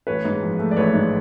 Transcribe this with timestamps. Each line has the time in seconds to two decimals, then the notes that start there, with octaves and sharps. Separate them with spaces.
0.07 A1 B4 C#5
0.25 G#2
0.43 F3
0.59 A3
0.71 D5
0.77 A1 B4 C#5
0.94 G#2